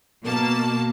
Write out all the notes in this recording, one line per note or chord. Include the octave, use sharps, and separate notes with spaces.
B2 A#3 A5